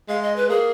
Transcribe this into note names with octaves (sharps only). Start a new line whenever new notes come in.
G#3 F5
D#5
B4
A#3 G#4